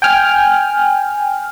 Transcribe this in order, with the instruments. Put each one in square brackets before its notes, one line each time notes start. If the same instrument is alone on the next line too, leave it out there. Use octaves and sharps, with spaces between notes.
[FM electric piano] G5 G#5 F6